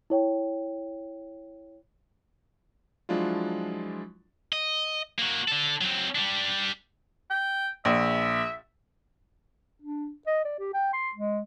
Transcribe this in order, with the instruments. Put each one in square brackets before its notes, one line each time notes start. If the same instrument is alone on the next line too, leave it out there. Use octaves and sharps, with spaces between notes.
[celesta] E4 C#5 G5
[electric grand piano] F3 F#3 G#3 D4 E4 F4
[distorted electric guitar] D#5
A#3 F#4
D3 A4
F#3 C4
G3 D4
[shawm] G5
[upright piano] A#1 [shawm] E5
[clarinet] D4
D#5
D5
G4
G5
C6
G#3